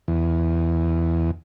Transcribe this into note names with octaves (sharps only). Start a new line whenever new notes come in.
E2